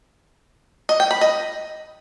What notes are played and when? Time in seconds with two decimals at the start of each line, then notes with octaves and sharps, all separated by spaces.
0.89 D#5
1.00 G5
1.11 B5
1.21 D#5